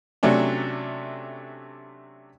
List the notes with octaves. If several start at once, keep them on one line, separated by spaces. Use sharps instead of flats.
C3 F#3 A3 C#4 D4